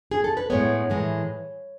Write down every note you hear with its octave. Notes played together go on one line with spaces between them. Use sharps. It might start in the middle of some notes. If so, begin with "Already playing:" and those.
G#4
A4
B4
A2 G#3 B3 C#5
A2 E3 G#3